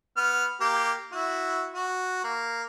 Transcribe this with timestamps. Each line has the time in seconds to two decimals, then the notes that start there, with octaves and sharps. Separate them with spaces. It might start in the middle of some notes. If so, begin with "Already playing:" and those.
0.17 B3 F6
0.61 A#3 G4
1.12 E4 F#4
1.75 F#4
2.24 A#3